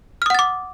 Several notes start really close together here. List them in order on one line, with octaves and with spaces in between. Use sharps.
F6 D#6 F#5 A6 D6